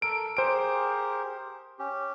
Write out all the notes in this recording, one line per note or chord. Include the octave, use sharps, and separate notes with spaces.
A4 A#4 D7
G4 G#4 A#4 C5 D7
C#4 G4